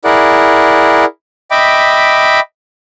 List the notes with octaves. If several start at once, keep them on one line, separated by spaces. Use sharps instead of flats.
E4 G#4 A#4 D5 F#5
D#5 E5 G5 B5 D6